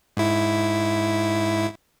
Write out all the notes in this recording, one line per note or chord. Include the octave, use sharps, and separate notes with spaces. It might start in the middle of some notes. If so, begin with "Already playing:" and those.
G#2 E4